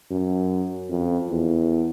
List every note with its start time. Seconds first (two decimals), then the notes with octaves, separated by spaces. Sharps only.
0.11 F#2
0.90 F2
1.31 E2